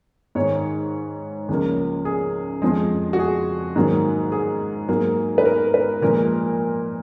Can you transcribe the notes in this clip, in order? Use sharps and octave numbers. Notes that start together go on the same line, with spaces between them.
G#2 D#3 G#3 C#5
C#2 C#3 F3 A#3
G#4
F2 F3 G#3
F#4
G#4
G#2 D#3 F#3 A#3
G#4
G#2 F#3 A#3
B4
A#4
B4
A#2 F3 G#3 A#4